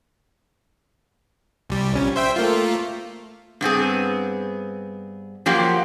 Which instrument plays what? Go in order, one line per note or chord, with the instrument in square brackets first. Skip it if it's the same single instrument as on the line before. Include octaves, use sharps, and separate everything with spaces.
[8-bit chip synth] C2 G3
A#1 C#4
C5 E5 G5
A3 A#3 F4
[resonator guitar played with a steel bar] G2 B3 C4 G#4
F3 F#3 A#3 G4